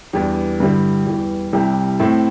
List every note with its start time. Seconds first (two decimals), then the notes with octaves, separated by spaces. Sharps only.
0.13 E2 E3 G3 D4 G4
0.60 G2 D3 G3 E4
1.07 E2 E3 G3
1.53 C2 C3 G3 E4 G4
1.99 A2 A3 C4 E4